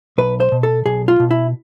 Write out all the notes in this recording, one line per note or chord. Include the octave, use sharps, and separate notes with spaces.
B1 B4
C5
B2
A4
B1 G#4
F4
B2
E4